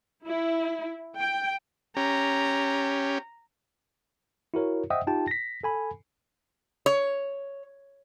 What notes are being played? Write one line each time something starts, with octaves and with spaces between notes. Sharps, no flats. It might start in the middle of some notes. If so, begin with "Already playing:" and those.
E4
G5
C#4 G4 A#5
E4 F#4 A#4 C#5
C5 D#5 E5 F#5 G5 D#6
D#4 F4 G4 G5 A5
A#6 B6
A4 G#5 B5
C#5